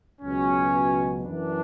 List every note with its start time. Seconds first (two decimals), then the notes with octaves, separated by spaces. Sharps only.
0.21 C#2 B2 F#3 C#4
1.24 F#2 E3 D4